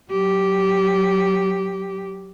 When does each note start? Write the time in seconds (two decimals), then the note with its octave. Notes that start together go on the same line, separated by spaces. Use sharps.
0.11 F#3 G4